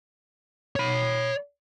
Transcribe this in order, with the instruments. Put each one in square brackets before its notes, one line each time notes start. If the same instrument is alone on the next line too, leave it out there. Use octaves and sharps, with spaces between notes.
[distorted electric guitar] C#5 B5